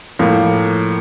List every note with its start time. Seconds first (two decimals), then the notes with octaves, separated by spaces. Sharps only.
0.19 A2 F3 A#3